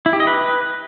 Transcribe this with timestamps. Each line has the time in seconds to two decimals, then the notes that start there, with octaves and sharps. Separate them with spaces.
0.06 E4
0.13 G4
0.20 D#5
0.27 B4